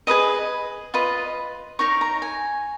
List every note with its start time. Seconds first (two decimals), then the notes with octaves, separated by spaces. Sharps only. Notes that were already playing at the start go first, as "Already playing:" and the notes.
0.07 G#4 B4 D#5 D#6
0.94 F4 B4 D#5
1.79 D#4 A#4 C#5 C#6
2.01 A#5
2.22 G#5